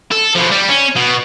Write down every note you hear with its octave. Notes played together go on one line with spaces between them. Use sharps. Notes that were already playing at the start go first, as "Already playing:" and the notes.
A4
B2 F3
G3
C#4
B2